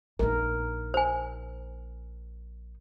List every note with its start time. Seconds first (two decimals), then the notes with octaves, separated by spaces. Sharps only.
0.19 A#1 D#4 A#4
0.94 C5 G#5